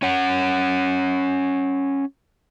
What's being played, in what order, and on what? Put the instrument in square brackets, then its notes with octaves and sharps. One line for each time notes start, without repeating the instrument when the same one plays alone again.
[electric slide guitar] C#4 C#5 F#5